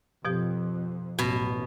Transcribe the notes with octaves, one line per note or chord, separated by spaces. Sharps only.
F2 B2 F3 G4
A1 F#2 B2